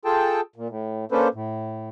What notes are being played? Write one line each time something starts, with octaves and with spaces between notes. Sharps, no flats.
F4 G#4 A4 G5 A5
A#2
A2
A#3 C#4 D4 A4 B4 C5
A2